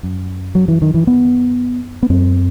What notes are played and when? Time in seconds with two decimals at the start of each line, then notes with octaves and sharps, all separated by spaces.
0.03 F#2
0.55 F#3
0.68 E3
0.82 D#3
0.94 E3
1.07 B3
2.03 B3
2.10 F#2 C4